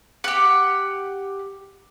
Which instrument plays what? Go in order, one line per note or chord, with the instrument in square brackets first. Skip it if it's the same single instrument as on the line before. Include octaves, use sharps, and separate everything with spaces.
[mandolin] G4 F#5